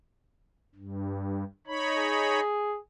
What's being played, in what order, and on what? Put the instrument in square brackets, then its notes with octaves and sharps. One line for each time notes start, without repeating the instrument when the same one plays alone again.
[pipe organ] G2
D#4 C#5 B5
[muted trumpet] G#4